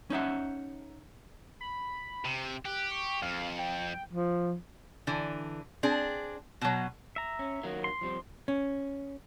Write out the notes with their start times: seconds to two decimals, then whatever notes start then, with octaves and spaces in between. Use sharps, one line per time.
0.10 C#4 D#4 E5 F#5
1.61 B5
2.25 C3
2.65 G4 F#6
2.91 C#6
3.22 F2 F5
3.59 G5
4.11 F3
5.07 D3 E3
5.83 C4 D4 G#4
6.61 B2 F#3
7.16 E5 A#5
7.39 C#4
7.63 D#3 F#3 A#3
7.84 C6
8.01 F3 G3 C4
8.48 C#4